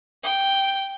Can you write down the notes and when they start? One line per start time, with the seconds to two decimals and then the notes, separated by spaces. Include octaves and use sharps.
0.23 G5